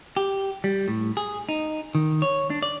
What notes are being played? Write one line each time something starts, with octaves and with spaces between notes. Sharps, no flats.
G4
G3
A2
G#4
D#4
D#3
C#5
D4
D5